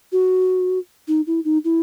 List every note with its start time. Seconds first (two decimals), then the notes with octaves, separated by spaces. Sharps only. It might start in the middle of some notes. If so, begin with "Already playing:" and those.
0.12 F#4
1.08 D#4
1.27 E4
1.45 D#4
1.64 E4